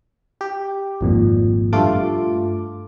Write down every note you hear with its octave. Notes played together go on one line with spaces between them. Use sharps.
G4
G#1 F2 A#2
G2 A3 F4 A4 D6